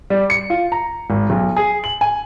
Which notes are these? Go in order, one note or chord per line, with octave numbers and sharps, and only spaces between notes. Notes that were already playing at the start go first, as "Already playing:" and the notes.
G3
C#7
F4
A#5
G#1
B1
G#4
F#7
G#5